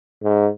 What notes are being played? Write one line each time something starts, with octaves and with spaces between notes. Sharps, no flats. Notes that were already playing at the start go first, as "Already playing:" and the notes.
G#2